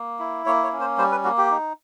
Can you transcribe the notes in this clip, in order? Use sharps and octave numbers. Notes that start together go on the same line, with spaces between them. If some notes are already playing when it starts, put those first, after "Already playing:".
Already playing: A#3
E4
A#3 C#5
C#5
C#4
C5
G3 C5
B4
A#3 F#4
G4
D#4